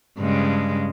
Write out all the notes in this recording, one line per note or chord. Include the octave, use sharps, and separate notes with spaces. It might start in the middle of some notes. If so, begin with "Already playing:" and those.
G2 C#3 G#3